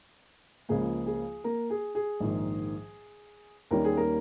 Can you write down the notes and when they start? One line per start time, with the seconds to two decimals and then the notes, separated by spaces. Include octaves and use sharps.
0.69 C#2 C#3 F3 A#3 G#4
1.06 G#4
1.44 A#3 A#4
1.70 G#4
1.95 G#4
2.20 A#1 G#2 D#3
3.71 D#2 D#3 G3 C#4 A#4
3.84 G#4
3.97 A#3 A#4